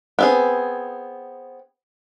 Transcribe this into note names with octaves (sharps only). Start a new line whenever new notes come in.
B3 C4 G#4